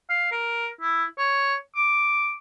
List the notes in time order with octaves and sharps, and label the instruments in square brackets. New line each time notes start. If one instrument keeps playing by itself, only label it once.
[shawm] F5
A#4
E4
C#5
D6